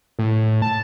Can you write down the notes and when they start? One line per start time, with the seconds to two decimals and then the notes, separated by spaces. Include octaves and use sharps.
0.19 A2
0.62 A5